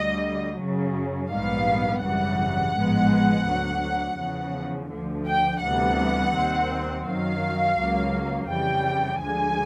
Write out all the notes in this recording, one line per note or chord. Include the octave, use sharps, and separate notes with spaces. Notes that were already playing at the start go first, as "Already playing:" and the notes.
Already playing: D2 D3 G3 D#5
F#2 C#3 F#3
A#1 G#2 D#3 G3 B3 F5
G#1 F#2 C#3 E3 G3 F#5
A1 G#2 F3 G#3 B3
D2 D3 F#3
E2 C#3 F3
D2 D3 F3
G5
D2 C3 E3 G3 B3 F#5
D#2 D#3 G3 C4
F#2 D#3 F#3 F5
C#2 C#3 F#3 A#3
F2 C#3 E3 G3 G5
D2 D3 F3 G#3 G#5